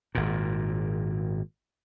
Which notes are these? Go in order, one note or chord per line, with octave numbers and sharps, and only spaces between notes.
G#1 A#2